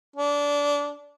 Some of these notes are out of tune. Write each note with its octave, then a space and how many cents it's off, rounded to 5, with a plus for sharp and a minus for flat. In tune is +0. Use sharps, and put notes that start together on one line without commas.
D4 -20